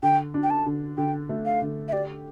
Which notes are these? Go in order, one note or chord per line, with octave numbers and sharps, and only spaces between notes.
D3 G5
D4
G5
A5
D3
D3 G5
A3
F5
D3
E5
G4 D5